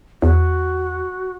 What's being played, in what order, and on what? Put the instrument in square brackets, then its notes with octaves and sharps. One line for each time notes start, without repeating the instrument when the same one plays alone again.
[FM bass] E2 [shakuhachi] F#4